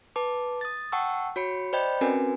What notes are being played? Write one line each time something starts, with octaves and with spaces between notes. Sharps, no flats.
B4 A5 D6
D#6 A6
F#5 G5 A5 C#6 E6
F#4 C#5 B5 C#7
C5 D5 D#5 G5 B5 G6
C4 C#4 F#4 A#4 B4 G#5